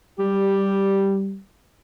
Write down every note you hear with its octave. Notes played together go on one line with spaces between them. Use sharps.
G3 G4